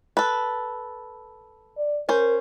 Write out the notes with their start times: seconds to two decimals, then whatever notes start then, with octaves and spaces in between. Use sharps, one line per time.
0.17 A4 B4
1.77 D5
2.09 C#4 A#4 C5